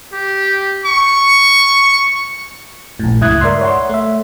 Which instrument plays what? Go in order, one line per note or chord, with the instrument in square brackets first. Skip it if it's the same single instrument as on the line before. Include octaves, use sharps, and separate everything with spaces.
[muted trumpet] G4
C#6
[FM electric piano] A#1 A2
C#2 G2 E4 D#6 F#6 G#6
A#4 D5 E5 C6
C#5 F#5 C6
A3 E5